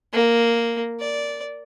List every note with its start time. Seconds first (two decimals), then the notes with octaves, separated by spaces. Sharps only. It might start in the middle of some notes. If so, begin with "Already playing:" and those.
0.13 A#3
1.00 D5